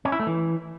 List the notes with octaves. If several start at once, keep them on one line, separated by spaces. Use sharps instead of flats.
C#4
E4
A3
E3